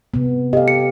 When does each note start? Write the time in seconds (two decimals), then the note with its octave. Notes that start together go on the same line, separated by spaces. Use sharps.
0.14 C3 B3
0.53 G4 A4 D#5 F5
0.68 C#7